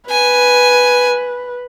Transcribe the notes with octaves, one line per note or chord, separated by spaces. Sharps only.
B4 G#5